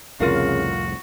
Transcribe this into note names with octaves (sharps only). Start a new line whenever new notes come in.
C2 F2 A2 C#3 F4 F#4 A#4 F5